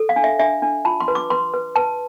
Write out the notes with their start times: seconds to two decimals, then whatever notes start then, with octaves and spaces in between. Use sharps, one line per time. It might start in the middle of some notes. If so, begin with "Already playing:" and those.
Already playing: A4
0.09 F5
0.16 D4
0.24 E5
0.39 D4 E5
0.62 D4
0.85 F4 A5
1.00 C6
1.08 B4
1.15 D6
1.30 B4 C6
1.54 B4
1.76 B4 A5